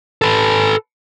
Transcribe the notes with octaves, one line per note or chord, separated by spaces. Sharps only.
A4 B4